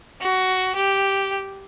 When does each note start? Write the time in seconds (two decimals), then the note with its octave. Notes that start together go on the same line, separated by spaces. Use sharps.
0.21 F#4
0.76 G4